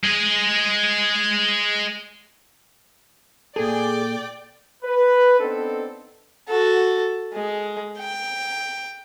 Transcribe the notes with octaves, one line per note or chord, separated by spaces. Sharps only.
G#3 G#4
A#2 G#4 A4 D5 G5
B4
B3 C4 D4 D#4 A4
F#4 A4
G#3
G5